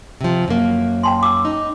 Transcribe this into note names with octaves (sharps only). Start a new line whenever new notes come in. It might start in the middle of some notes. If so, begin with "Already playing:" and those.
C3 F3
F#2 A#3
G5 A5 C6
D6 E6
D#4